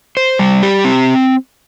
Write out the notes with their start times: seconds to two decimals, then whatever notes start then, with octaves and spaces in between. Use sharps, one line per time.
0.17 C5
0.39 G3
0.63 G4
0.85 C4